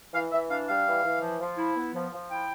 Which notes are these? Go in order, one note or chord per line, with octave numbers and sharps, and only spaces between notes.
E3 F5
E3 E5
D4 F5
G3 F5
E3
E3
F3
F3
E4
B3
F3
F3
E4 G5